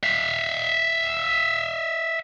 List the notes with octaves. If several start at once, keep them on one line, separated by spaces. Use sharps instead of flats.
E5 F5